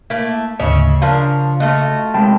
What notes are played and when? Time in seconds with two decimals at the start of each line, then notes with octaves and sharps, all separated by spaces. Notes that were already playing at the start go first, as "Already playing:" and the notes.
0.10 A3 A#3 E4
0.60 D2 G#2 C#3 C#5 D#5 E5
1.02 F3 D4 A#4 F5
1.60 A3 F4 F#4 D#5
2.14 C3 G#3 G5 A5 B5